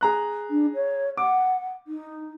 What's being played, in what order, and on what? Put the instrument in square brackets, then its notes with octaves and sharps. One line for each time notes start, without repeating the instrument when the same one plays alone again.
[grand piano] G#4 A#5 F#6
[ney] D4
C#5
[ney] F#5 [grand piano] D6
[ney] D#4